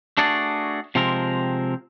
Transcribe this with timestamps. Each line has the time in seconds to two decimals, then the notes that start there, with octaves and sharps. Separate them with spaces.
0.18 A3 D4 F#4 G#4 D5
0.95 C3 F3 G#3 C4 A#4